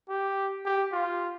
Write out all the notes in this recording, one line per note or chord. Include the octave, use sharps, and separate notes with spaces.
G4
G4
F4